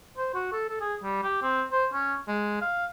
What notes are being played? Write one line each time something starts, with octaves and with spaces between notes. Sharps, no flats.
C5
F#4
A4
A4
G#4
G3
G4
C4
C5
C#4
G#3
F5